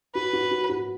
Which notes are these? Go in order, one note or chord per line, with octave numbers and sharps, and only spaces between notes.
F#4 B4
F#4
F#4
F#4